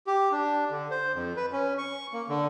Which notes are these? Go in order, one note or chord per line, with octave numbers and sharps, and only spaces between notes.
G4
D4
D3
C5
F2
B4
C#4
C#6
A#3
D3